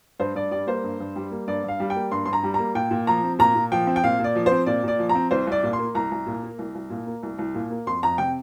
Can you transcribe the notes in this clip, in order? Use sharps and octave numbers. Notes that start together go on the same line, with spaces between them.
G2 C5
G2 D5
G3 D5
A#3 C5
G2
G2
G3
A#3
G2 D5
G2 F5
G3
G5
A#3
G2 C6
G2 C6
A#5
G3
A#3 A#5
A#2 G5
A#2
F3 A#5
C4
A#2 A#5
A#2
F3 G5
C4
G5
A#2 F5
A#2
D5
F3
C4 C5
A#2 D5
A#2 D5
F3
A#5
C4
C2 C5
C2 D5
A#2
C6
A#3
C2 A#5
C2
A#2
A#3
C2
C2
A#2
A#3
C2
C2
A#2
A#3
F2 C6
F2 A#5
C3 G5